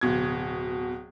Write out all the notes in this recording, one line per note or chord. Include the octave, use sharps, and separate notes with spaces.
D1 B2 G#6